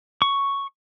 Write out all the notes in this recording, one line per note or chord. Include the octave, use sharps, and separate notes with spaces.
C#6